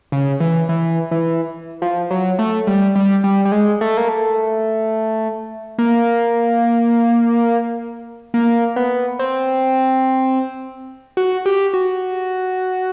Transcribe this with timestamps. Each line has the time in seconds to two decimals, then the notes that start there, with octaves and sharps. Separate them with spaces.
0.12 C#3
0.40 E3
0.69 E3
1.11 E3
1.82 F3
2.11 F#3
2.39 A3
2.67 G3
2.96 G3
3.24 G3
3.45 G3
3.52 G#3
3.81 A3
3.97 A#3
4.09 A3
5.78 A#3
8.34 A#3
8.76 B3
9.19 C4
11.17 F#4
11.46 G4
11.74 F#4